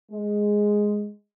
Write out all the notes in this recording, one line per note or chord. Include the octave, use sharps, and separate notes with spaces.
G#3